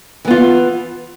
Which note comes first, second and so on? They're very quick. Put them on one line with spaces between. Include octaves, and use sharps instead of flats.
E3 B3 F4